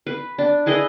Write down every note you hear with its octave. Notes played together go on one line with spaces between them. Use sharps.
B4
D4
E4 G#4 B4 D#5